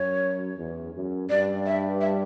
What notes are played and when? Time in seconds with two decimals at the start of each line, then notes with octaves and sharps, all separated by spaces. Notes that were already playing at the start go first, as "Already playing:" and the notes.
Already playing: F#2 C#5
0.58 E2
0.95 F#2
1.29 G2 D5
1.66 E5
2.01 E5